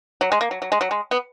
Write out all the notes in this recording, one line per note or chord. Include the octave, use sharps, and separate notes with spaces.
F#3
G#3
A#3
F#3
F#3
G#3
F#3
G#3
B3